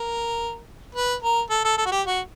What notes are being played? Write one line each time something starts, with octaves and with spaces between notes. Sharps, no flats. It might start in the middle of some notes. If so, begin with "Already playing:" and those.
Already playing: A#4
B4
A#4
A4
A4
A4
F#4
G4
F#4